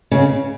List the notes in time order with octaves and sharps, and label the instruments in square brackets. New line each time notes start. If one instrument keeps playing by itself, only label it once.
[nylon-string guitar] C#3